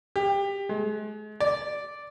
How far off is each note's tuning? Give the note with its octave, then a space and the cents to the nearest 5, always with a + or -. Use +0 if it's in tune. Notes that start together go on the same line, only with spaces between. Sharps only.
G4 +20
G#3 +40
D5 -5